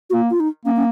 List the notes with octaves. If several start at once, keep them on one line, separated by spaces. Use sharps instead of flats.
F#4
A#3 F4
F4
D#4
A#3 C#4
C#4